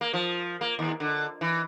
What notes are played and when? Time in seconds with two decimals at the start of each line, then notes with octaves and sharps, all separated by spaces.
0.01 A#3
0.14 F3
0.61 A#3
0.79 D#2
1.00 D3
1.41 E3